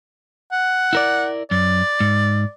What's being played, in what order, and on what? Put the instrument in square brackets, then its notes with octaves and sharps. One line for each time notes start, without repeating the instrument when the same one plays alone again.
[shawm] F#5
[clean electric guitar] E4 A#4 D5
[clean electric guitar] F#2 [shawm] D5
[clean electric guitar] G#2